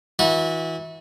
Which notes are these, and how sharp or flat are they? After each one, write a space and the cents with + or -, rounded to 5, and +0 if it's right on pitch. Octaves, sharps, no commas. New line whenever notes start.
E3 -30 F#4 -35